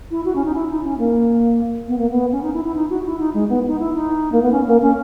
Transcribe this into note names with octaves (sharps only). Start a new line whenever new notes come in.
E4
F#4
C#4
D#4
E4
D#4
C#4
A#3
B3
A#3
B3
C#4
D#4
E4
E4
D#4
F#4
E4
D#4
G#3
B3
D#4
E4
D#4
A#3
B3
C#4
A#3
C#4